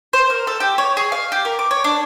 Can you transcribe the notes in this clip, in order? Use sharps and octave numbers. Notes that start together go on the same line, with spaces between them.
C5
A#4
A4
G4
C#5
G#4
F5
G4
A#4
D6
C#5
D4